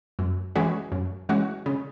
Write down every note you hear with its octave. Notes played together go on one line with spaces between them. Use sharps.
F#2
E3 G#3 C#4 F#4
F#2
E3 G#3 C#4 F#4
C#3